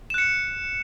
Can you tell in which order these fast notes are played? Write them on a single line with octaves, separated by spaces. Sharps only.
E7 F#6 C#7